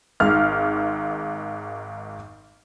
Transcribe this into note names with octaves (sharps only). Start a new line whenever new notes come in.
G#1 G#2 F6